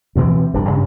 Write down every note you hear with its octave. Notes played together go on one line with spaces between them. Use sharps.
D2 B2 E3 C4
E1 G2 G3 D4
G2 C#3 C#4